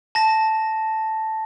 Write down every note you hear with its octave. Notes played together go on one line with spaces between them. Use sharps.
A5 A#6